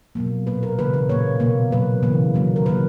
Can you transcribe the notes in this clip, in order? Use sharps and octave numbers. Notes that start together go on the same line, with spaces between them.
B2 F#3 A#3
A#2 A#3 B4
A#4
C#3 E3 A#3 B4
B4
A#2 A#3 C#5
B2 A#3
B2 F#3 A#3 B4
C#3 E3 A#3
D#3 F#3 A#3
A#4
D#3 F#3 A#3 B4